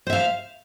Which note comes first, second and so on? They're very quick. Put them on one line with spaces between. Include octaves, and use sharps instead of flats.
C5 E5 F5